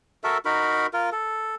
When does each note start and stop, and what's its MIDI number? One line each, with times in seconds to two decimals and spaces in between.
0.24 0.38 66
0.24 0.38 69
0.24 0.38 70
0.24 0.38 76
0.45 0.87 63
0.45 0.87 66
0.45 0.87 70
0.45 0.87 83
0.93 1.10 65
0.93 1.10 70
1.12 1.55 69